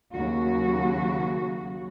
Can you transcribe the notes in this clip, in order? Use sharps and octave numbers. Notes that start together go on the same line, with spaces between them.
D#2 C#3 F#3 F#4